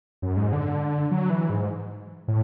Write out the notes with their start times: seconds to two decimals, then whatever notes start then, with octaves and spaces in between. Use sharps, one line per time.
0.22 F#2
0.37 G#2
0.53 D3
1.11 F#3
1.30 E3
1.50 G#2
2.28 A2